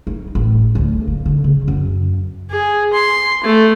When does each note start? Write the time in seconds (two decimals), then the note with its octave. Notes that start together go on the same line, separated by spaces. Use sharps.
0.07 D#4
0.35 A1
0.75 D2
1.07 A#3
1.26 D3
1.44 C#3
1.68 F#2
2.51 G#4
2.94 C6
3.44 A3